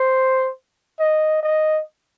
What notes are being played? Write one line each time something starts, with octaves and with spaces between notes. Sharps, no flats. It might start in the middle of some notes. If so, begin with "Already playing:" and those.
Already playing: C5
D#5
D#5